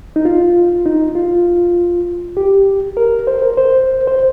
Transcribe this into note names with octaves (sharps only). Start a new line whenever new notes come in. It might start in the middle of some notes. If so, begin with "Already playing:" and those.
D#4
F4
D#4
F4
G4
A#4
C5
A#4
C5
C5